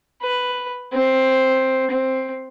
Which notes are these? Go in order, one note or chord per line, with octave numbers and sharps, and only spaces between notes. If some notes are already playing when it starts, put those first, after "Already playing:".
B4
C4
C4